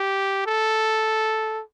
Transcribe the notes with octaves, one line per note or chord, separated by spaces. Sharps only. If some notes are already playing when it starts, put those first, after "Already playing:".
Already playing: G4
A4